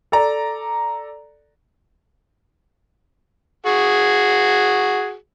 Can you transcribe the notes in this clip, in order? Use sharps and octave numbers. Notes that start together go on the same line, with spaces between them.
A4 D5 A#5
F#4 G#4